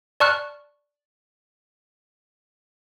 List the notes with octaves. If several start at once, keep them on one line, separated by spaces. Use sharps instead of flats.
D5 A5 C#6 F6 F#6